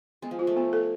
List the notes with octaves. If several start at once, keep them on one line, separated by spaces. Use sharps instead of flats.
G#3 B3
F3
F4
A3
B3
A4